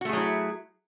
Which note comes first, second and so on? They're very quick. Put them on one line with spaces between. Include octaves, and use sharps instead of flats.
F#4 A3 G#4 F#3 E4